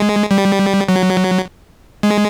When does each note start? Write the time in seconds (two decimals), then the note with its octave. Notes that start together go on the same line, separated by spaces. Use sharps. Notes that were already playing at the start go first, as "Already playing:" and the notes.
Already playing: G#3
0.31 G3
0.89 F#3
2.03 G#3